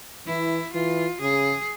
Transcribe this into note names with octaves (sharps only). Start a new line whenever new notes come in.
E3 E4
E3 F4
C#3 G#4